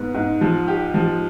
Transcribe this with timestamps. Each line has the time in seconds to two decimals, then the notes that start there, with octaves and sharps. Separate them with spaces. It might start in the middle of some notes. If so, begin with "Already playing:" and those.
Already playing: G#2 B3
0.14 G#2
0.41 F3
0.68 G4
0.94 F3